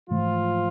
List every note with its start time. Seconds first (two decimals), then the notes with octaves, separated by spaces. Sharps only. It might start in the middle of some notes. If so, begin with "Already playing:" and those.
0.10 G#2 E3 F3 A3 F4